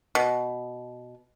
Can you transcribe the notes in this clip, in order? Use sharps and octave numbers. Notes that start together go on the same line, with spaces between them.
B2